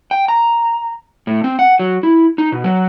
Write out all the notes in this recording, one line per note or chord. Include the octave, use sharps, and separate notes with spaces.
G5
A#5
A2
C4
F#5
F#3
E4
D#4
B2
F#3